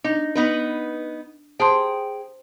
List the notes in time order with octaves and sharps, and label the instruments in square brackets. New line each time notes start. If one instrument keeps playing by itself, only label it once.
[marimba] D4 [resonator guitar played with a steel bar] D#4
[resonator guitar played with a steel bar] B3 D#4 B4
[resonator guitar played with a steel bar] G#4 G5 [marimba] C5 A5 C6